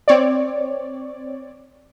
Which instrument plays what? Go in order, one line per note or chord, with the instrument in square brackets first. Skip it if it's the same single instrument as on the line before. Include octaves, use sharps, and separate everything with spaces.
[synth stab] C4 C#5 D5